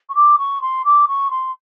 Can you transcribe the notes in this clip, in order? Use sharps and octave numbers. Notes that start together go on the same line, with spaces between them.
C#6
D6
C#6
C6
D6
C#6
C6